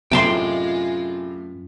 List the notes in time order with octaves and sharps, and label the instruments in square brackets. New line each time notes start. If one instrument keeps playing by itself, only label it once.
[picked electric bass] F#2 [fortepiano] A2 C3 [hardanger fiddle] G#3 F4 [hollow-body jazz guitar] G5 A5 C6